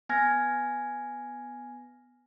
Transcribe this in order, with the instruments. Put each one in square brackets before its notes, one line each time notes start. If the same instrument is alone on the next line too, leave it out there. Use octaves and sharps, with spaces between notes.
[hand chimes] B3 G#5 F6 G#6 A#6